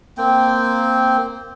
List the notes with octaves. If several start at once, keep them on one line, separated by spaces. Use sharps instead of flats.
A#3 C4 G5